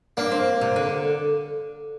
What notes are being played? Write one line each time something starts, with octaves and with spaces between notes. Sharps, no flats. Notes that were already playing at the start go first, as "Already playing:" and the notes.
A#3 D4
C4
C3
D3